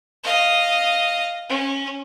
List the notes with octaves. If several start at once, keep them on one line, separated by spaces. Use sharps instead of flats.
D#5 F5
C#4